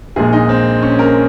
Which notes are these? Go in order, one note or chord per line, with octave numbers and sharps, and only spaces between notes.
A#1 A#2 G#3 G#4
D#4
C4
C#4
A#4